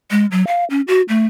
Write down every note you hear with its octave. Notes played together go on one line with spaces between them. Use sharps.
G#3
F#3
F5
C#4
F#4
A3